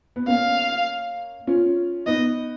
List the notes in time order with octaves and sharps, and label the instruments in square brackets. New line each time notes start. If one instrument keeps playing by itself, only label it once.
[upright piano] B3
[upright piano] A#3 C#4 [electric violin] F5
[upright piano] C#4 F4
[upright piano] B3 D#4 [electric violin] D#5